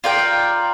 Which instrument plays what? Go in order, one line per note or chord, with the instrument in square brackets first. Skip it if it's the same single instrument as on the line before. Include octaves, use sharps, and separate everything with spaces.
[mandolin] F4 A#4 D5 G5